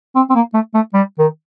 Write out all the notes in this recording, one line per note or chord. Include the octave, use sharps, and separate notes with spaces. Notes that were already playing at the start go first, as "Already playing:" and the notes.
C4
C4
A#3
A3
A3
G3
D#3